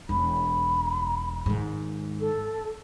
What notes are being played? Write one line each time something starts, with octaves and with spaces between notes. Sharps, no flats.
E1 B5
G#2 D#3
A4